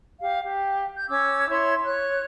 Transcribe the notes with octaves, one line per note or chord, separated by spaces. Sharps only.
G4 F5
G4
G6
C#4 D6 E6 G#6
E4 C#5 C6 G#6
C#5 F#6